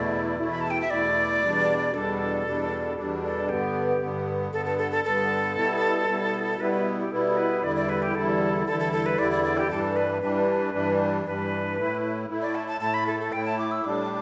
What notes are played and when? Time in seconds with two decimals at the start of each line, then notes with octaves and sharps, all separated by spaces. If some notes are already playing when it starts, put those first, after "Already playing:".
Already playing: E2 B2 A3 E4 D5
0.39 E2 B2 A3 E4
0.51 B5
0.61 A5
0.70 G5
0.81 E5
0.90 E2 B2 A3 E4 D5
1.42 E2 B2 G3 D4
1.94 E2 B2 G3 D4 A4
2.46 E2 B2 G3 D4
2.97 E2 B2 G3 D4 A4
3.23 A4
3.49 G2 D3 B3 G4
4.01 G2 D3 B3
4.52 G2 D3 B3 A4
4.65 A4
4.78 A4
4.92 A4
5.05 G2 D3 B3 A4
5.56 B2 G3 B3 E4
6.08 B2 G3 B3 E4
6.60 B2 G3 B3 E4 B4
6.73 B4
6.99 G4
7.11 B2 G3 B3 E4 A4
7.29 A4
7.37 B4
7.63 E2 D3 G3 E4 D5
7.76 D5
7.89 B4
8.02 G4
8.15 E2 D3 G3 E4 A4
8.67 E2 D3 G3 E4 A4
8.80 A4
8.93 A4
9.06 B4
9.19 E2 D3 G3 E4 D5
9.31 D5
9.44 D5
9.57 G4
9.70 G2 E3 G3 D4 A4
9.96 B4
10.22 G2 E3 G3 D4 B4
10.74 G2 E3 G3 D4
11.25 G2 E3 G3 D4 B4
11.77 A2 A3 E4
12.29 A2 A3 E4
12.42 D5
12.55 A5
12.68 A5
12.81 A2 A3 E4 A5
12.94 B5
13.07 A4
13.20 A4
13.32 A2 A3 E4 G5
13.46 A5
13.58 D6
13.71 E6
13.84 A2 G3 D4 D6